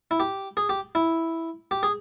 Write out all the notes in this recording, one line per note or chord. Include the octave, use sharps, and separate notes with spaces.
E4
G4
G#4
G4
E4
G4
G#4